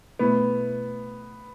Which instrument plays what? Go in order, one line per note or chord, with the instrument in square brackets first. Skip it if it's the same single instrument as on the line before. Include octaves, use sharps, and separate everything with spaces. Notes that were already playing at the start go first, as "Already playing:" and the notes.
[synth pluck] B2 A3 E4 [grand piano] B3